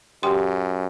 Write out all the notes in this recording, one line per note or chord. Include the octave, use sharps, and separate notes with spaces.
F#2 G4 G5 C6